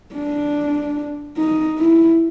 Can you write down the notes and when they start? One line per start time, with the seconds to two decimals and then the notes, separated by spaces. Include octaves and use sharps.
0.15 D4
1.37 D#4
1.79 E4